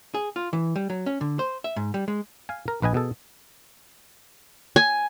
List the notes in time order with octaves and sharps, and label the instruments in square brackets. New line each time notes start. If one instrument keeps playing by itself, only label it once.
[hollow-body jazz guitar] G#4
F4
E3
G3
F#3
C#4
D3
C5
E5
G#2
G3
G#3
[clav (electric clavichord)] F5 G#5
A#4
A#1 B4 D#5 G#5
B2 G#4 A4
[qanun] G#5